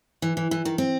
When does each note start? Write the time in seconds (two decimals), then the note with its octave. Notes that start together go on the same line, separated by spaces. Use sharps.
0.22 E3
0.37 E3
0.51 E3
0.65 D#3
0.78 C4